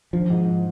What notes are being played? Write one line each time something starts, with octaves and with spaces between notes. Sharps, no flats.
D#3 F3
G#2
D#4